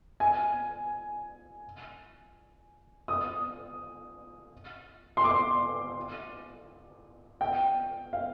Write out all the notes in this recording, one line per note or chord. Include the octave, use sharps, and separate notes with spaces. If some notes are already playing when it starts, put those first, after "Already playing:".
G#5
D#6
C6
D6
G5
F5